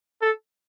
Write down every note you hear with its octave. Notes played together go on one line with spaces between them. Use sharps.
A4